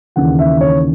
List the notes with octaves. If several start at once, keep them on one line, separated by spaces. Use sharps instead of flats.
D#2 C#3 E3 F#5
E5
C#5